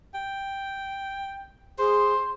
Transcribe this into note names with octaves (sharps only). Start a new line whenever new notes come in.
G5
G#4 C5 C6